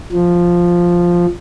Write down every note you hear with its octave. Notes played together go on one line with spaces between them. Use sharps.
F3